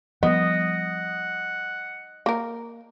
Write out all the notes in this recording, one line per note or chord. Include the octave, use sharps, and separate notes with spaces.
F3 G3 B3 D#5 F#5
A#3 A#4